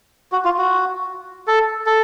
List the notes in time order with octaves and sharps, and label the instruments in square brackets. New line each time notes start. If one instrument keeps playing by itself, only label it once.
[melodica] F#4
F4
F#4
A4
A4